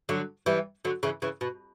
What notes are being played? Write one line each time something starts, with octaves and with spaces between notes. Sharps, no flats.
D3 F#3
E3 G3
D3 F#3
C#3 E3
C#3 E3
B2